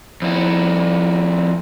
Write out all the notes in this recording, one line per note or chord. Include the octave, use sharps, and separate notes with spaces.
F2 E4